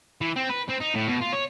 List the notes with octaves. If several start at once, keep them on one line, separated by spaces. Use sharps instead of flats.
E3
C4
B4
C4
D#4
A2
B2
F4
C#5